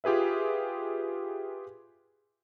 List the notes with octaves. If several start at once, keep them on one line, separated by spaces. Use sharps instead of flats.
F4 G4 G#4 B4 E5